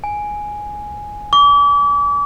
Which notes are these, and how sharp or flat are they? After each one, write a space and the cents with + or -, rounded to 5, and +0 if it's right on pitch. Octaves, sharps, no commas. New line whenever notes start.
G#5 +0
D6 -35